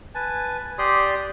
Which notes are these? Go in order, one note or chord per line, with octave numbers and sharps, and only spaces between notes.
B4 G#5 A5
G4 D5 C6 D#6